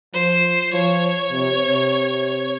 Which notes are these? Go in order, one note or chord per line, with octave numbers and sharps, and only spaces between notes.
F3 C5
F3 C#5
C3
C3